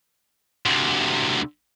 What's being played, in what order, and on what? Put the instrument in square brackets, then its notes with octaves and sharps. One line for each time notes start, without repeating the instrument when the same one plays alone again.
[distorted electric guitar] D2 C3